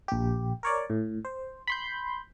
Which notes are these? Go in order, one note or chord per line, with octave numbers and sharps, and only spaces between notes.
A#1 G4
A#4 C#5 D5
A2
C5
B5 C6 G6